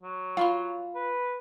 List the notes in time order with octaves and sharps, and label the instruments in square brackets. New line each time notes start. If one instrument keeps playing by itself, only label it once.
[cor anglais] F#3
[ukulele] F4 [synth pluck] F5 B5 C6
[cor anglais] B4